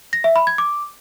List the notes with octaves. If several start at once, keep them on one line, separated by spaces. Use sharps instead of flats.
A#6
E5
B5
G#6
D6